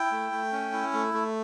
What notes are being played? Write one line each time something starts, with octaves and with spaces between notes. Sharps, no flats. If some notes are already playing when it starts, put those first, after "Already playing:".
Already playing: E4 G5
A3
A3
C#4
E4
A3
A3